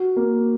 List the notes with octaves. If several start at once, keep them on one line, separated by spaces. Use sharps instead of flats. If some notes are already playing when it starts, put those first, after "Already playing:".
Already playing: F#4
A#3